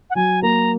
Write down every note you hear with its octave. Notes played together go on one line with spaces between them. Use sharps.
F#5
F#3 G#5
A#3 A#5